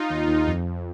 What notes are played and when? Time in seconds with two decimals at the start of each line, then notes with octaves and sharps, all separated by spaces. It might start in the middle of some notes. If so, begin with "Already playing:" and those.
Already playing: D#4 F4
0.10 D#2
0.28 D#2
0.48 F2
0.66 F2